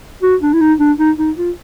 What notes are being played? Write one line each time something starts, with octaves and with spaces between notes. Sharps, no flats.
F#4
D4
E4
D#4
D4
D#4
D#4
F4